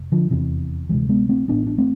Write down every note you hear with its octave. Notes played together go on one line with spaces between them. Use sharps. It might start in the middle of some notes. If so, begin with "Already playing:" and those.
Already playing: F1
D3 F3
F1 E2 C3 E3
D2 C3 E3 G#3
G#3 B3
A3 C4
A1 A2 B3 D4
D4
A3 C4